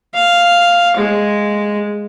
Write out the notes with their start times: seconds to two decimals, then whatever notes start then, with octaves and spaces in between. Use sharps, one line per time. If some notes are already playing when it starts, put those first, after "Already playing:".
0.14 F5
0.97 G#3